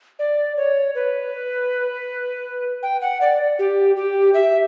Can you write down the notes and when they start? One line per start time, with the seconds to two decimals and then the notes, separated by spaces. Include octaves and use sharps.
0.19 D5
0.57 C#5
0.95 B4
2.83 G5
3.01 F#5
3.21 D5
3.59 G4
3.96 G4
4.34 E5